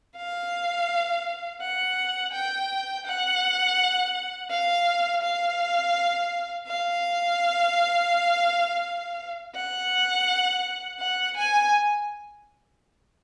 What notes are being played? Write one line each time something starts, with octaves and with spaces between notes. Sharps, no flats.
F5
F#5
G5
F#5
F5
F5
F5
F#5
F#5
G#5